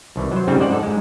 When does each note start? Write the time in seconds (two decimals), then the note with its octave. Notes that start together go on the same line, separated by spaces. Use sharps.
0.16 C2 D#3 E3
0.32 F#3 C5
0.48 G#2 C#3 G3 C4 D#4
0.60 F2 G#3 C5 D5 F#5
0.71 D#4 A4
0.83 G#2 G#3